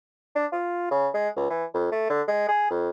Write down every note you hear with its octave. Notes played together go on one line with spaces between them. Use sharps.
D4
F4
C#3
G#3
C#2
E3
F2
A3
D3
G#3
G#4
F2